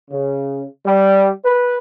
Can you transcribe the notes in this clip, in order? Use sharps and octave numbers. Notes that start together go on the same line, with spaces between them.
C#3
G3
B4